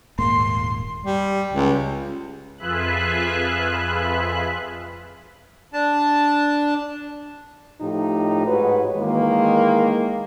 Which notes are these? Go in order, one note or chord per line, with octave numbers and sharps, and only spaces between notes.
D#1 G#2 A#3 C6
G3
C#2
F2 F4 G#4 B4 E5 F#6
D4 A5
A2 F3 D#4 G4
G#2 F#4 B4 C#5
D#3 E3 G#3 A#3